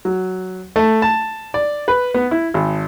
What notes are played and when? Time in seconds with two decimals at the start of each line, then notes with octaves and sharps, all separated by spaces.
0.05 F#3
0.76 A3
1.02 A5
1.54 D5
1.88 B4
2.14 B3
2.31 E4
2.54 G#1